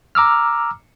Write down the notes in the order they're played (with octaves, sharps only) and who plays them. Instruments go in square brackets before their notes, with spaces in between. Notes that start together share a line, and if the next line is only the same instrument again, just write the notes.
[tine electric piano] A#5 D6 E6 F6